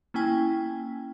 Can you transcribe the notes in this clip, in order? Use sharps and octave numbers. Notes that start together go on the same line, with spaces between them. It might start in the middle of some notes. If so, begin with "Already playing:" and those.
A#3 C#4 E4 G5 G#5